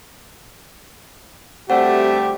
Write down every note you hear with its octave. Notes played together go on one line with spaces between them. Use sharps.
D2 G3 A3 C4 G4 F#5